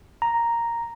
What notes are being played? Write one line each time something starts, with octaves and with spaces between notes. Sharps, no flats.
A#5